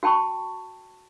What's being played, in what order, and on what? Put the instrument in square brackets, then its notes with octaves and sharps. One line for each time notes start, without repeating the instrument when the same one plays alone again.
[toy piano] F#4 G5 A5 B5 C#6